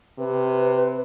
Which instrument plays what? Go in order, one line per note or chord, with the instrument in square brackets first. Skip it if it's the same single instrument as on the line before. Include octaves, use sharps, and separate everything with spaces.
[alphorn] C3 [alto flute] B4